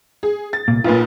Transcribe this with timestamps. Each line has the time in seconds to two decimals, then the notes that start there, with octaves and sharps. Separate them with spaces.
0.23 G#4
0.53 A6
0.68 C2 A#2
0.84 B1 A#2 F4 B4